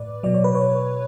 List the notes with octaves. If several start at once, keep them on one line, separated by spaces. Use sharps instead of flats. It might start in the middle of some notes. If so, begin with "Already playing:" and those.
Already playing: A2 B4 D5
B2 F#3 D5
C#5
B4
C#5